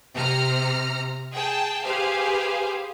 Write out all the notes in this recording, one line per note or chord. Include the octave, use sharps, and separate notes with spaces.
C3 A#5 F6
G#4 G5 A5
G4 G#4 B4 C5 F5